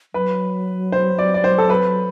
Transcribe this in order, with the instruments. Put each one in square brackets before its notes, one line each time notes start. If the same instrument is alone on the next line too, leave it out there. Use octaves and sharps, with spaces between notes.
[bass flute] F#3 [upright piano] B4
[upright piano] C5
D5
D5
C5
A4
B4